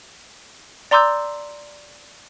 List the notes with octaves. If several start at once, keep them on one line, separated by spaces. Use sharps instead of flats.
D5 A#5 C6 D6 E6 G6